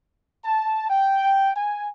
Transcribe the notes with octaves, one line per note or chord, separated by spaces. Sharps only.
A5
G5
G#5